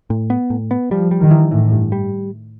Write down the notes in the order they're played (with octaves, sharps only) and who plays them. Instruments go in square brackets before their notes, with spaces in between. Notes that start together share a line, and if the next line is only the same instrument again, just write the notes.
[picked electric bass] A2
B3
A2
B3
[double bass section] F3 [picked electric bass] G3
[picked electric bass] G3
[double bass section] D#3
[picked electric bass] E3
[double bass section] A2 [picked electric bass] E3
[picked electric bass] G2
G3